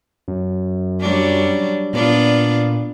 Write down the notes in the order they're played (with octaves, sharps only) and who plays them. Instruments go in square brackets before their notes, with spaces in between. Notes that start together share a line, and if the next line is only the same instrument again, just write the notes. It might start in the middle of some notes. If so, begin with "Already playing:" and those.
[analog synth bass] F#2
[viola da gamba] F#3 G3 D4
[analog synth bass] A#2 [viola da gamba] B3 D4 F4